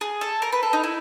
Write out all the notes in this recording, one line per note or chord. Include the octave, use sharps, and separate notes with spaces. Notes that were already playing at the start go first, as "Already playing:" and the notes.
G#4
A4
A#4
B4
A4
D#4
E4